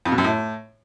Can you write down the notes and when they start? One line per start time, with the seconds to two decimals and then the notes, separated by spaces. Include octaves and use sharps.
0.05 F2
0.12 B2
0.18 F#2
0.24 A2